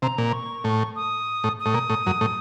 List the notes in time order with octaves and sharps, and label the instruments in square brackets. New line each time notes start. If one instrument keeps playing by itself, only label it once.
[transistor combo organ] C3 [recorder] A#5
[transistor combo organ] A#2
[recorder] C#6
[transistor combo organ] A2
[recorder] D#6
[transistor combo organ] A2
[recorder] D#6
[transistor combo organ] A2
A#2
A2
F#2
A2